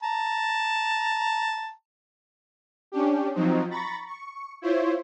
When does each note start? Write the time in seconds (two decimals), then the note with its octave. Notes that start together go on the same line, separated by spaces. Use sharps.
0.03 A5 A#5
2.92 C#4 D4 G4
3.34 F3 F#3 C4 D#4
3.70 A#5 B5 C#6 A6
4.07 C#6
4.62 E4 F4 C5 C#5